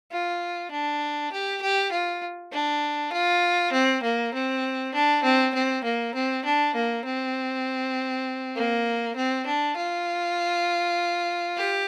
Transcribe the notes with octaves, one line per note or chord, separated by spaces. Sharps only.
F4
D4
G4
G4
F4
D4
F4
C4
A#3
C4
D4
C4
C4
A#3
C4
D4
A#3
C4
A#3
C4
D4
F4
G4